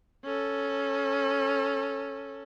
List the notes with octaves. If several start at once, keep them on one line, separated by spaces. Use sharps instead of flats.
C#4 A4